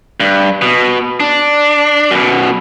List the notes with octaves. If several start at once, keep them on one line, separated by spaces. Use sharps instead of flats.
G2
B2
D4
F#2 B2